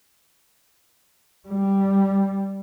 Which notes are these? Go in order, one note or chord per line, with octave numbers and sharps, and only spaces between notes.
G3